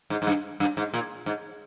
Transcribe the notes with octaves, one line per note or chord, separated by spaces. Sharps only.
G#2
G#2
G2
G2
G#2
A#2
G#2